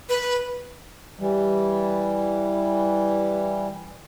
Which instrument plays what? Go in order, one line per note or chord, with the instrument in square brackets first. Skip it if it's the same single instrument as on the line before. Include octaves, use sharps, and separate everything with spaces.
[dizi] B4
[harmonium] E3 G3